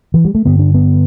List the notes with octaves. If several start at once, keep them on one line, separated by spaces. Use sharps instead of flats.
E3
G3
A3
G2 D3 B3
D4
B3